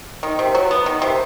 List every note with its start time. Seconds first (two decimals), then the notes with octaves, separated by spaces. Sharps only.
0.23 D#3
0.39 C3
0.55 F#3
0.71 B3
0.86 D#3
1.02 C3